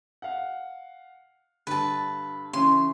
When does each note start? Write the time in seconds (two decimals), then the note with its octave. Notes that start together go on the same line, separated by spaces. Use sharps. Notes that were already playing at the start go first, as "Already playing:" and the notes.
0.22 F5 F#5
1.67 G2 D3 B4 A5
2.53 C#3 E3 C#4 C6